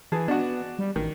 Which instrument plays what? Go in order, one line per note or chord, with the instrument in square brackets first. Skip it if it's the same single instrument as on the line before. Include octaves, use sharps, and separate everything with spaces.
[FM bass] E3 [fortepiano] G#4 A5
[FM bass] B3 [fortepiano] D4 F#4
[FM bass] G3
[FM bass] A1 [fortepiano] D#3